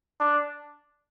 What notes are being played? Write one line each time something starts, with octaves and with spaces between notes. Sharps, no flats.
D4